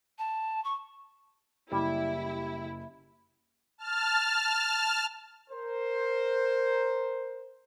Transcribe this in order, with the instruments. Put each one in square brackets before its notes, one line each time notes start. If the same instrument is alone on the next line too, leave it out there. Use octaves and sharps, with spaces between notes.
[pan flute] A5
C#6
[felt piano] F#1 [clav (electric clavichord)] G3 [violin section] E4 [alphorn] G4
[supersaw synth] A5 F6
[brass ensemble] A#4 C5